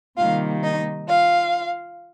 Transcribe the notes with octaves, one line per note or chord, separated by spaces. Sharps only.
C3 D#3 G3 A#3 F4 F5
D#4 D#5
F4 F5